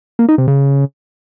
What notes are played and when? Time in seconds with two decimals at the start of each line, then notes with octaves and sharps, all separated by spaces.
0.19 A#3
0.29 D#4
0.38 C3
0.48 C#3